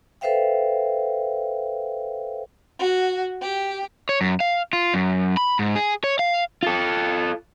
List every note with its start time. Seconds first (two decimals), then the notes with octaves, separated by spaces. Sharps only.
0.21 A4 B4 C5 E5 F5 G5
2.79 F#4
3.40 G4
4.09 C#5
4.21 F#2
4.40 F5
4.73 F4
4.94 F#2
5.37 B5
5.59 G#2
5.76 G#4
6.04 C#5
6.19 F5
6.63 F4 A4